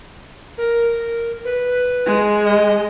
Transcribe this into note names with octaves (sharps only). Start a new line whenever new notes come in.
A#4
B4
G#3
D#5